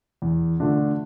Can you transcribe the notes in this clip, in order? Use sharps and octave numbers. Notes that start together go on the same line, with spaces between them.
E2
D3 A3 D4 F4